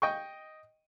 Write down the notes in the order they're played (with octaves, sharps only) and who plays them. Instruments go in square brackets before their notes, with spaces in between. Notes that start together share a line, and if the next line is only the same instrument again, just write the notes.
[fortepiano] D#5 G5 C#6